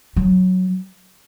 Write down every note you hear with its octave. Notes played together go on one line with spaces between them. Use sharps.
F#3